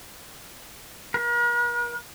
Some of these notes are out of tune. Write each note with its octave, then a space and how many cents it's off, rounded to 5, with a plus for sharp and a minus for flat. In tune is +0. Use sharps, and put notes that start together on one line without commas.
A#4 +45